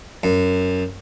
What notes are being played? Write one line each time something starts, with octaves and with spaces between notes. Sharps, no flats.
F#2